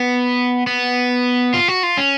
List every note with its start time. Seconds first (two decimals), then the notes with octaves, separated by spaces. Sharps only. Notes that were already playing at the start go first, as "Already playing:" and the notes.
Already playing: B3
0.67 B3
1.54 F4
1.68 F#4
1.83 F4
1.97 C#4